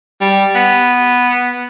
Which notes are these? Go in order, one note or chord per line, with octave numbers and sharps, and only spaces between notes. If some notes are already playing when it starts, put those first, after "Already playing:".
G3
B3